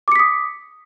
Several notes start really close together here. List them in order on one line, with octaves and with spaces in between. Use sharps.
D6 C#7 B6 D#6